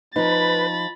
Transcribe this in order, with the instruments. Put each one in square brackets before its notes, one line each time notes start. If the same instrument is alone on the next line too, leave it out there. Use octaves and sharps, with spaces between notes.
[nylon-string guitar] F3 D#4 [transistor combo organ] B4 [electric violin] B5 A6